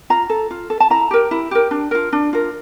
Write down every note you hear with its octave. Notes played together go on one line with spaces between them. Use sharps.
F4 A#5
A4
F4
A4
A5
E4 A#5
G4 A#4
E4
G4 A#4
D4
F4 A#4
D4
F4 A#4